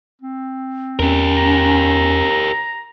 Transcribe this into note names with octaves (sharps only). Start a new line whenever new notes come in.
C4
E2 C#4 G4 A#4
A#5